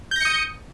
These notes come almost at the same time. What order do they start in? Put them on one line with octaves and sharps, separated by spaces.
G6 A#6 C#7 D#6